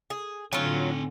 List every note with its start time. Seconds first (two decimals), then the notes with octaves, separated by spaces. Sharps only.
0.10 G#4
0.53 A2 D3 F#3 C4 F4 G#5